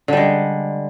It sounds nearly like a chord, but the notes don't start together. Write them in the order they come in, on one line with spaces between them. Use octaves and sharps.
D3 G3 G#3